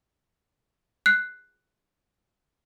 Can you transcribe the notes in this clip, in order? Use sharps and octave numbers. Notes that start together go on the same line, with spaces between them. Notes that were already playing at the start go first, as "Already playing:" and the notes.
F#6 C7